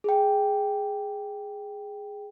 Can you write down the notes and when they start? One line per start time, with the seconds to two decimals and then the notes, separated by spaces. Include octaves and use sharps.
0.04 G#4 G5